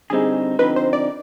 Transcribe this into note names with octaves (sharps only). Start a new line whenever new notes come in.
D3 G3 C4 D#4 G#4
D3 F3 C4 D#4 B4
C5
D5